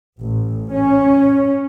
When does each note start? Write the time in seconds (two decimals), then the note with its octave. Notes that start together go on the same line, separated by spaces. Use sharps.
0.20 A1
0.72 C#4